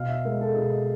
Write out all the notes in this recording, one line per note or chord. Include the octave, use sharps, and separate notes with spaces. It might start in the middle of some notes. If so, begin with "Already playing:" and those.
Already playing: B2 F5
E5
G#3 A#4
A4
B2 G#4